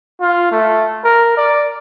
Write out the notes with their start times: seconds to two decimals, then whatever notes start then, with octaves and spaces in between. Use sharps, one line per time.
0.21 F4
0.52 A3
1.04 A#4
1.37 D5